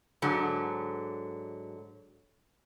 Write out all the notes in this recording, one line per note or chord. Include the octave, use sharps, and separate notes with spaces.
G#2 D3 F#3